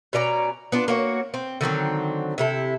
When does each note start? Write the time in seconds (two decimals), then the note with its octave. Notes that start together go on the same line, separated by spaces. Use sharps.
0.13 B2 C#4 D5 A#5
0.72 B3 D4 F4
0.88 A#3 F#4 C#5
1.34 C4
1.61 D3 D#3 F#3 C4
2.38 C3 E4 A4